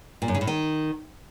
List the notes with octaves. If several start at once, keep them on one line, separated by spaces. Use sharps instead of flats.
A#2
F#2
C#3
A2
D#3